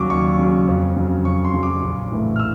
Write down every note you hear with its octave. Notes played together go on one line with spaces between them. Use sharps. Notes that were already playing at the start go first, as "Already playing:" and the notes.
Already playing: D#2 C#3 F#3 C#6 D6
D#2 C#6
C#3 F#3
F2
C#3 F#3
F2 C#6
C6
C#3 F#3
D6
A#1
A2 E3 A3
F6
E6